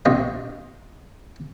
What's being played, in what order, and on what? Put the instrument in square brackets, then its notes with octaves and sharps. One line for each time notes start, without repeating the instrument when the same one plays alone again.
[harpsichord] A#1 C3 F4 D#5